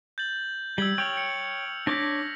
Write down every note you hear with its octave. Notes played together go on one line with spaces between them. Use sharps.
G6 A6 F#7
G3 E6 G#6 F#7
C#5 G5 F6 F7
C#7
D4 C#5 D6 A#6 B6